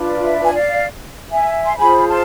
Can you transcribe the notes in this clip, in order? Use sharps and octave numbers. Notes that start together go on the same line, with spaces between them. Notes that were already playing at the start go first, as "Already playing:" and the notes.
Already playing: D4 F4 B4
E5
G#5
D5 F5
E5 G#5
C6
F4 G#4 C5 G#5 B5
A5 C6